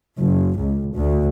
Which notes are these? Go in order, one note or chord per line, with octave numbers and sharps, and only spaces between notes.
F#1
C#2
D2